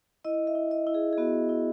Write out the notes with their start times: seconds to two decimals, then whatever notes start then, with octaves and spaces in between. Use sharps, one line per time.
0.25 E4 D#5
0.47 E5
0.55 E4
0.71 D#5
0.87 E4
0.94 G#4
1.13 G#4
1.18 B3 F#4
1.49 E4